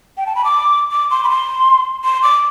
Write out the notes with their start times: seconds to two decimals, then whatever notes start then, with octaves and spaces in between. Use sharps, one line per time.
0.17 G5
0.26 A5
0.35 B5
0.45 D6
0.91 D6
1.11 C6
1.24 B5
1.29 C6
2.04 C6
2.23 D6